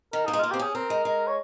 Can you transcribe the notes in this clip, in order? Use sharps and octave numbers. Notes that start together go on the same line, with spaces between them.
D#3 A#4
A#3 D#4
G#3
A#3 F4
C4 G4
C#4 G#4
C4 A#4
G#3
G#3
C#5